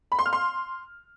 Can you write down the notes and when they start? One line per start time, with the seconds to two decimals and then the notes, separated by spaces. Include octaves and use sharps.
0.12 B5
0.19 C6
0.26 F6
0.33 C6